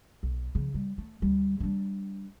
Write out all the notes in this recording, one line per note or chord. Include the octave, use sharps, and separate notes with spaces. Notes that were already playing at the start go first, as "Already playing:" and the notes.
B1
C#3 F3
G3
A3
D2 G3
G3 D4